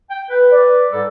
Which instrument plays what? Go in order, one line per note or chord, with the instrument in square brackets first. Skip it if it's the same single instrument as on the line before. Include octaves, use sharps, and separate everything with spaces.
[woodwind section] G5
B4
[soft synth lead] D5
[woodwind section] G#2 G3 A4